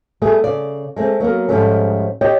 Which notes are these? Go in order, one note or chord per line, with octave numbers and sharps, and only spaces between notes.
G3 A3 B3 G#4
C#3 D5
G#3 A3 C4
F#3 A#3 B3 A#4
G#2 F3 G3 A3 C#4
G4 C#5 D#5 G5